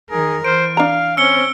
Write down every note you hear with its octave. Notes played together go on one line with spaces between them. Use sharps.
D#3 G#4 A#4
E3 C5 F6 D7
D4 F5 A#5
C4 C#4 C5 E6 C#7 G7